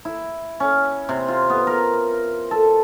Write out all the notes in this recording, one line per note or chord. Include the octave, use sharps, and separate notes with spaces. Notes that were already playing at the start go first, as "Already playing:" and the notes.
E4
C#4
C3
F4
B3
A#4
A4